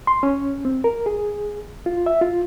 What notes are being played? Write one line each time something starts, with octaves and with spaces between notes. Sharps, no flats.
C6
C#4
C4
A#4
G#4
F4
E5
F4